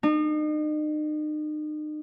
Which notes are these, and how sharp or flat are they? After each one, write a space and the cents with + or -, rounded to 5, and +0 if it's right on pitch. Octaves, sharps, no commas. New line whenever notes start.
D#4 -40